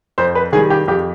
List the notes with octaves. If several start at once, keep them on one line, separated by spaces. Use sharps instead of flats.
F2 C5
B4
D#3 G3 G#4
G4
F2 G4